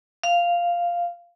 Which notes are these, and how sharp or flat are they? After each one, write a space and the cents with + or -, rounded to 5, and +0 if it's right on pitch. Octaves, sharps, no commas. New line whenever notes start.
F5 -5